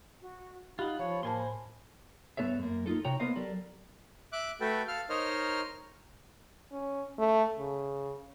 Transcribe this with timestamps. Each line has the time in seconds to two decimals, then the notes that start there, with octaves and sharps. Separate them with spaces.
0.22 F#4
0.79 D#4 F4 G4 F#5 B5
0.99 F3 C#5 F5
1.23 A2 A#3 C5 G#5 A5 C6
2.37 G2 G#3 B3 A4 C#5 E5
2.59 F#2 A#3
2.86 A#3 D#4 F4 A4
3.05 C3 F#4 C#5 G5 A#5
3.20 A#3 B3 A#4 C5 D#5 F5
3.36 F#3 G4 A4 A#4 D5
4.32 E5 D6 F#6
4.61 A3 F#4 A4 B4 G5
4.88 A4 F5 F6
5.09 D#4 A#4 C5 C#5 D#5 F6
6.72 C#4
7.19 A3
7.59 C#3